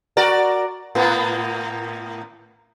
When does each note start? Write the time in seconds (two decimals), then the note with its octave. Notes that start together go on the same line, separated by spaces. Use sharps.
0.17 F#4 A#4 D5
0.95 A2 A#3 B3